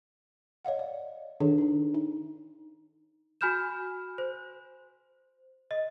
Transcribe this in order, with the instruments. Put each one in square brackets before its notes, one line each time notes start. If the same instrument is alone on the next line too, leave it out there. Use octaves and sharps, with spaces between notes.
[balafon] C#5 D#5 F5 F#5
D5
D#3 D4 G#4 A4 C#5
D4 D#4
D#4
[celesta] F#4 G#5 B5 F6 G6 E7
C5
D#5